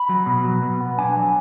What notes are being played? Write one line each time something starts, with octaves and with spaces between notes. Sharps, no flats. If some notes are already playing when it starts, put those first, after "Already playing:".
Already playing: B5
F#3
B2
F#3
B2
B3
D4 G#5
F#3